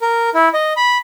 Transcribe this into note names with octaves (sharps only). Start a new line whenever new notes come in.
A#4
E4
D#5
B5